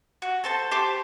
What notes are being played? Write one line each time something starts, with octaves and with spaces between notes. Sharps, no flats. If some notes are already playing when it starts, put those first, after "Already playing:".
F#4
A4 C5 A5
G4 C5 A5 D6